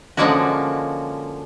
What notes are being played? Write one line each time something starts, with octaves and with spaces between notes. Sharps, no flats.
D3 F3 G#3 A#3 C#4 F#4